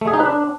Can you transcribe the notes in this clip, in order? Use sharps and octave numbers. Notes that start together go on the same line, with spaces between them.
A3
G#4
D#4
B4
D4